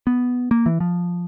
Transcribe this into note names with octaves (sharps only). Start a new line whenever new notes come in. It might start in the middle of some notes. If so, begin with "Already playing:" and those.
B3
A#3
E3
F3